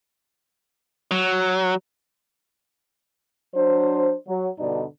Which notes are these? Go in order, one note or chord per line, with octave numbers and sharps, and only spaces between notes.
F#3
F#3 D4 C5
F#3
G2 B2 D3 D4 D#4